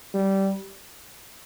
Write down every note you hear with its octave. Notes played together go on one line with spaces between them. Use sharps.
G3